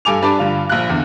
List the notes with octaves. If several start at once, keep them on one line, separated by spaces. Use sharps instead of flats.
G2 A4 G#5 D6 F7
G3 D4 B4 A5 D6
G2 D3 F4
A#1 F5 F#6
E2 D3